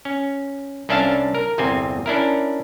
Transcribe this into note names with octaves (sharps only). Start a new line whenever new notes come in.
C#4
C2 C#4 D4 E5 F5 A5
A#4
G1 E2 C3 C4 G#5
C#4 D4 E4 A#4